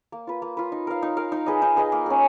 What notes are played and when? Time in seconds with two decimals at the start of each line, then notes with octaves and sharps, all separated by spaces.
0.12 A#3
0.27 F4 B4
0.42 A#3
0.57 F4 B4
0.72 D#4
0.87 A#4 F5
1.02 D#4
1.17 A#4 F5
1.32 D#4
1.46 G#4 B4 D#5
1.62 D#4
1.77 G#4 B4 D#5
1.92 A#3
2.06 C#4 G#4